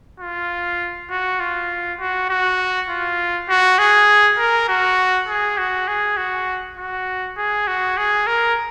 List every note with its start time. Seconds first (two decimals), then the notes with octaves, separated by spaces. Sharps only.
0.20 F4
1.10 F#4
1.40 F4
2.00 F#4
2.29 F#4
2.89 F4
3.49 F#4
3.79 G#4
4.38 A#4
4.69 F#4
5.28 G#4
5.58 F#4
5.88 G#4
6.17 F#4
6.78 F#4
7.37 G#4
7.67 F#4
7.97 G#4
8.27 A#4